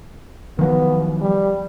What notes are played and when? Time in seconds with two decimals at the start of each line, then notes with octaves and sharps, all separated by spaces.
0.59 D#3 F3 F#3 B3
1.21 G3